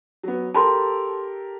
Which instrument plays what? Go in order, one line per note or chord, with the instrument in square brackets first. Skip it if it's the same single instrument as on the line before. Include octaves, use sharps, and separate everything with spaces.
[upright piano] F#3 B3
[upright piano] G4 A4 A#4 [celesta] A5 B5 C6